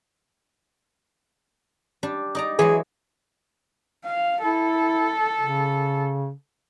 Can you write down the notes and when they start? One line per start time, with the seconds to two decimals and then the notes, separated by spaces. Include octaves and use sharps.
2.03 G3 D4 G4
2.35 D#4 D5 A#5
2.59 E3 F#3 G#3 G#4
4.05 F5
4.43 E4 A4
5.40 C#3